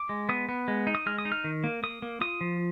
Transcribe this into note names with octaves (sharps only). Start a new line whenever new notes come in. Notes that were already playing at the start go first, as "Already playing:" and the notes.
Already playing: D6
G#3
B3 D#6
B3
G#3
D#4
D#6
G#3 F6
D#6
D#4
F6
D#3
A#3
A#3 D#6
A#3
F4 D#6
F3